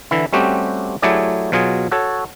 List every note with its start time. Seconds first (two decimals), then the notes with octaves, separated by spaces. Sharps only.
0.11 D3 E3 E4
0.33 G3 A3 C4 C#4 F#4 G4
1.02 F#3 A3 E4 G4 G#4 D5
1.52 B2 F#3 F4 G#4
1.91 F#4 A4 C#5